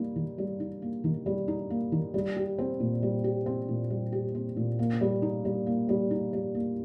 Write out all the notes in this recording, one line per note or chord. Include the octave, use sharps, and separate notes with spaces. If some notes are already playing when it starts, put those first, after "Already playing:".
Already playing: G3 A#3 D#4
D#3
G3
D#4
A#3
D#3
G3
D#4
A#3
D#3
G3
G4
C4
A#2
G3
G4
C4
A#2
G3
G4
C4
A#2
A#3
G3
D#4
G3
A#3
G3
D#4
G3
A#3